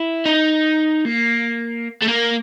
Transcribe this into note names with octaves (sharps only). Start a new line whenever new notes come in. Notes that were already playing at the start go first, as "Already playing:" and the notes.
Already playing: E4
D#4
A#3
A3
A#3